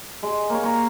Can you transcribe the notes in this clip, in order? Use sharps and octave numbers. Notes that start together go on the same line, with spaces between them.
G#3
A#3 C#5
C#5 A#5 C#6